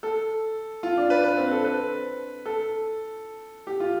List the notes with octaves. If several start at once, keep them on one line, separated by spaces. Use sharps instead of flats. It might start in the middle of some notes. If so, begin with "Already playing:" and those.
A4
F4
D4
B4
B4
C4
A4
B4
A4
G4
F4